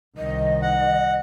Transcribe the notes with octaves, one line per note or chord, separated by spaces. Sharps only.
C2 D#3 D#5
F#5